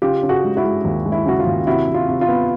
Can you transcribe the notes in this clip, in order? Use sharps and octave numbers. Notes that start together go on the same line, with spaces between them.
C#3 F4 G4
C#3
F#4 G#4
G#3
E4 F#4
G#3
D#2
G#3
E4
C#3 F#4
F4
D#2
C3 E4 F#4
C3
F4
C3
F4
B3